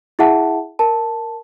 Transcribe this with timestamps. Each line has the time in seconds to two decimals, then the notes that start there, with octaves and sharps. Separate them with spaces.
0.19 E4 G#4 E5 F#5 A5
0.79 A#4 A5